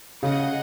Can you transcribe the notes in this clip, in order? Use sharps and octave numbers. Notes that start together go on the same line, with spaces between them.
C#3 G#4 D#5 F#5